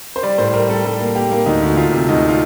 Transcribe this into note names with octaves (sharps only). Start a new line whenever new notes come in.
C5
G3 D5
A2 C5
G3 A#4
G3 A4
G3 A4
A#3
A#3 G4
A#3
D2 D#4
D2
D2 F4
C3
D2 D#4
F4